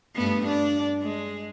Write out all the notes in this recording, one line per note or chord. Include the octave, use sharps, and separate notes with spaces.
G2 A3 B3
D4 D5
G#3